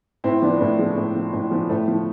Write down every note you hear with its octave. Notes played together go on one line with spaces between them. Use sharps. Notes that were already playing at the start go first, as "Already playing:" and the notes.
A2 C4 E4
F3 B3 D4
A2 A3
F3 G#3
A2
F3
A2
F3
A2 A3
F3